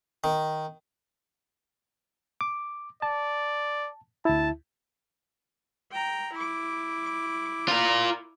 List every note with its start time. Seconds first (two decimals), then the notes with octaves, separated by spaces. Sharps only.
0.24 D#3
2.41 D6
3.02 D5 A5
4.25 D2 E4 A5
5.92 G5 A#5
6.33 E4 D6
7.68 F4 A#4